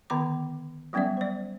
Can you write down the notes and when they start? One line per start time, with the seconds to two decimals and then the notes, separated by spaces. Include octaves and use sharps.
0.10 D3 D#3 B3 A#5 D6
0.93 F#3 G3 B3 C#4 D5 E5
1.17 C5 D5